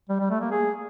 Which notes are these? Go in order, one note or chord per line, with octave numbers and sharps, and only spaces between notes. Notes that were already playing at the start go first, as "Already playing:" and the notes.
G3
G3
A3
A#3
G#4